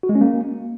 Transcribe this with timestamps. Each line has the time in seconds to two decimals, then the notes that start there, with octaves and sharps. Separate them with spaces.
0.03 F#4
0.09 G#3
0.15 C#4
0.21 A#3